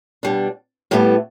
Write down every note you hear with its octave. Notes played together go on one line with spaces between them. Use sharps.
B2 G3 D4
A2 G3 B3 E4 A4